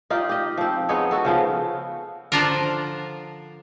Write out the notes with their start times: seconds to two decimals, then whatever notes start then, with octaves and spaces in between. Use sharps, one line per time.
0.10 D#4 F4 G4 D5
0.29 G4 D#5
0.57 F3 C4
0.89 B3 D#4 G#4 C#5
1.11 F#4 A4
1.25 C#3 F3 B3
2.32 D3 F3 D4 F4 A#4